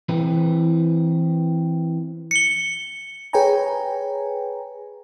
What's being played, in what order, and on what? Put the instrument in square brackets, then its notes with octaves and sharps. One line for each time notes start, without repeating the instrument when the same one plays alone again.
[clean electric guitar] E3 C4 B4
[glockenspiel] C#7 G7
[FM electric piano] G#4 B4 C#5 G5 G#5 A#5